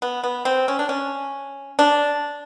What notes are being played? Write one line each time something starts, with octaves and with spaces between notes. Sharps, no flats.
B3
B3
C4
C#4
D4
C#4
D4